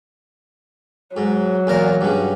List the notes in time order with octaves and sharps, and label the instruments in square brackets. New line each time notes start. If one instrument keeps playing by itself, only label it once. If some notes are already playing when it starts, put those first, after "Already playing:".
[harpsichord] G#2 [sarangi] F#3
[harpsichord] E2 A#2 A#4
G2 C#3